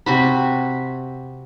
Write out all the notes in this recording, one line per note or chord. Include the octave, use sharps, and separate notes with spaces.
C3 F#4 B5